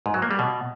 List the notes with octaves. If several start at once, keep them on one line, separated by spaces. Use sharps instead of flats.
G#2
F#3
A#3
G3
B2